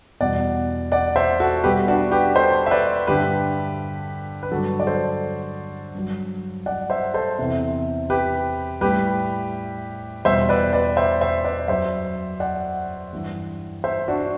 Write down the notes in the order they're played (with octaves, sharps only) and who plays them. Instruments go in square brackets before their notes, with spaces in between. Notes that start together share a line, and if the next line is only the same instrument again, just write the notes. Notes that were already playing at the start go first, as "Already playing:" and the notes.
[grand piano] E2 B2 G3 D5 F#5
D5 F#5
C5 E5
F#4 A4
B2 G3 G4 B4
D4 F#4
G4 B4
A4 C5
E5
B4 D5
G2 D3 G3 G4 B4
B4
G2 D3 F#3 F#4 A4
D5
A4 C5
G2 F#3
D5 F#5
C5 E5
A4 C5
E2 C3 E3
G4 B4
A2 G3 G4 B4
E2 B2 G3 C5 E5
B4 D5
B4 D5
C5 E5
C5 E5
B4 D5
F#2 F#3 C5 E5
D5 F#5
G2 E3 G3
C5 E5
D4 F#4